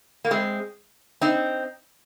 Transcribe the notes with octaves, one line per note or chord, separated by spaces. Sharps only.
A#3
G#3 C4
C4 D#4